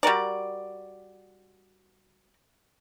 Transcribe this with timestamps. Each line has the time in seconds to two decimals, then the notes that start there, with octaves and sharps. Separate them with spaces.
0.03 G3 F#4 A#4 D5